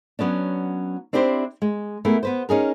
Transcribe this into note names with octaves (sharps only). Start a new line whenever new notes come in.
F#3 B3 C#4 D4
C4 D4 E4 G4 A#4 C5
G#3
A3 B3 E4 G#4 A#4
B3 B4 C5
C#4 D#4 G#4 A#4